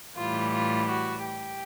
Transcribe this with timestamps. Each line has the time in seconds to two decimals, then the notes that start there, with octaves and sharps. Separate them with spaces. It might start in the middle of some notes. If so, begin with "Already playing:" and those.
0.17 A2 E3 G3 F4
0.53 F4
0.89 F#4
1.24 G4